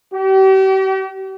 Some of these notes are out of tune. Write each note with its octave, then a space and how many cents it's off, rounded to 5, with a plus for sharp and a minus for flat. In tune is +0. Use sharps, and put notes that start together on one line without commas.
G4 -40